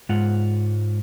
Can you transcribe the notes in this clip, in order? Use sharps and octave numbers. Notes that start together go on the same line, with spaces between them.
G#2 G#3 F4 F#5